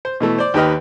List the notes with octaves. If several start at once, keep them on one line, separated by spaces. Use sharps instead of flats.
C5
B2 E3 A3
C5 D5
D#2 D#3 G4 B4 D#5 F6